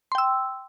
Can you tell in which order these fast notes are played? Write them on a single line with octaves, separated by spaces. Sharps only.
C6 G5 E6